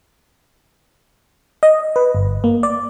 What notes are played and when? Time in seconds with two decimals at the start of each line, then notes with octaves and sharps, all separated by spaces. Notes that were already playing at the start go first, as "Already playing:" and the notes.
1.63 D#5
1.96 B4
2.15 G1
2.44 A#3
2.63 D5